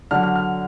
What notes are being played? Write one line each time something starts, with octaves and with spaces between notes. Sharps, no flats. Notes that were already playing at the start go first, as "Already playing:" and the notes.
D3 F#3 D4 F6
F6
F6